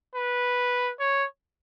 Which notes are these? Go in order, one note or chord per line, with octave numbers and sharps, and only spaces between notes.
B4
C#5